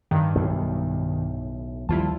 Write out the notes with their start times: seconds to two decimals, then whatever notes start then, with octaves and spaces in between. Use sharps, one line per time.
0.11 G2 D#3
0.35 B1 A2
1.89 D#2 F3 G3 E4 F4 A5